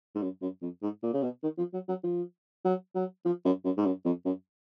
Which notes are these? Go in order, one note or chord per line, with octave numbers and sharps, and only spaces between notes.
G#2
F#2
F#2
F2
G#2
A#2
C#3
B2
D#3
F3
F#3
F#3
F3
F#3
F#3
F3
F#2
F#2
G#2
F#2
F2
F#2